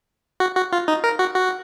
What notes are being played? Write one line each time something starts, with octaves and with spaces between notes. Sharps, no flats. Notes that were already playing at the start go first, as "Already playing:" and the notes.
F#4
F#4
F4
D#4
A#4
F#4
F#4